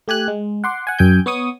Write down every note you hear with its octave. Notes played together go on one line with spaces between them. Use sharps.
A3 G4 G#5 F#6
G#3
F#5 C6 D6
F#5 G#5
F#2 G5 G#5 G6
B3 C#5 C#6 D#6